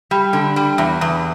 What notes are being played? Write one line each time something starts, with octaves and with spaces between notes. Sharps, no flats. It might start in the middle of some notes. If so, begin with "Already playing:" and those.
G3
D3
G3
E2
E2